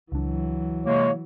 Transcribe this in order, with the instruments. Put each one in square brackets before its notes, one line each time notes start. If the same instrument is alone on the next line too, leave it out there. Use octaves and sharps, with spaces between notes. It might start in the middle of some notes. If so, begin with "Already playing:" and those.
[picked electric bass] C#2 D4 [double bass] E3 F#3
[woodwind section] C3 G#3 A#3 [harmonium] C#5